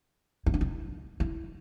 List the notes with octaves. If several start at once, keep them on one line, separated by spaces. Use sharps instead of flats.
E4
D4
E4
E4